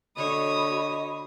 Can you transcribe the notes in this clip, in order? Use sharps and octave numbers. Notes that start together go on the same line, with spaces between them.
D3 F#4 C#5 D#5 B5 D#6